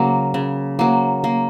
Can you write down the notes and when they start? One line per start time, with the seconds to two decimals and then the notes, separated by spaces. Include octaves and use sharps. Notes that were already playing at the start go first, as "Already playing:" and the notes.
Already playing: C#3 F#3 A#3
0.34 C#3
0.79 F#3 A#3
1.24 A#3